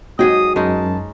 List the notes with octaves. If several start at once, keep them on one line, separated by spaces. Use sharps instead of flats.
G#2 F#3 G#4 D#5 G5 D#6
F#2 G#3 C#4 D#4 A5